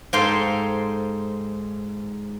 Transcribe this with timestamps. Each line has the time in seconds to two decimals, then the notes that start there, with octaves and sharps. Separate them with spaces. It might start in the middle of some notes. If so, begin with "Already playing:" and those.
0.13 G#2 A4 C5 F5 G5 C6